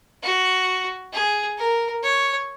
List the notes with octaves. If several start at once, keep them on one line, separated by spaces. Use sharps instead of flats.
F#4
G#4
A#4
C#5